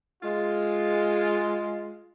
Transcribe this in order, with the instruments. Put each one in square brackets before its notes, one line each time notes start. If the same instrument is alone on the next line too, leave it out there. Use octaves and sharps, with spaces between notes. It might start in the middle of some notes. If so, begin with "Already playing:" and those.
[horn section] G#3 F4